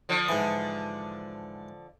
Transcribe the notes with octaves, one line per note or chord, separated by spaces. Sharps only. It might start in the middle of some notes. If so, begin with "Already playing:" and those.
D3 F3
G#2 E3